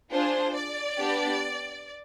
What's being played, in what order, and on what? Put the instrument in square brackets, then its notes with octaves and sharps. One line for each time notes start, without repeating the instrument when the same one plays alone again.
[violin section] D4 F4 G#4 C5
D5
B3 D4 G4